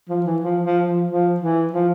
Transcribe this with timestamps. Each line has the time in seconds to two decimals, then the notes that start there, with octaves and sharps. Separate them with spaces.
0.09 F3
0.26 E3
0.42 F3
0.64 F3
0.86 F3
1.08 F3
1.40 E3
1.73 F3